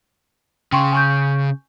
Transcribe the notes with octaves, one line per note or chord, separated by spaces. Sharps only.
C#3 G5 C6 C#6
G#5 C#6 G6